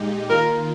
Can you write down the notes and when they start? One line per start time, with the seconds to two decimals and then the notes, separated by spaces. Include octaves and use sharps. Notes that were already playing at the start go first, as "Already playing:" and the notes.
Already playing: A#2 G#3 D#4 G4
0.30 D#3 A#3 F4 A#4